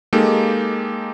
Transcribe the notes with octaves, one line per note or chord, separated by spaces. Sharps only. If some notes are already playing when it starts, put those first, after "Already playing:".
G#3 A#3 D#4 G4 A4